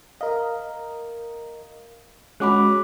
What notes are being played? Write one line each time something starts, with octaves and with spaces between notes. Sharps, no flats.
A#4 D#5 F5
G#3 C#4 F#4 B5 D6 F#6